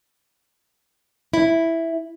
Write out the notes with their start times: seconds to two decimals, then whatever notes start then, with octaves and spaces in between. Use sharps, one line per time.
1.33 E4